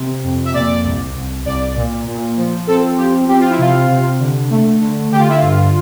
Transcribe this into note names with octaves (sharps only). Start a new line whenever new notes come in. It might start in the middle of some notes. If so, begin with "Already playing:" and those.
Already playing: C3
F2
E5
A#2 D5
C2
C2
C2 D5
A#2
A#2
F3
C4 A4
F3 G4
C4 G4
F4
E4
C3 F4
C3
D3
A3
D3
D3 G4
F4
E4
F4
G2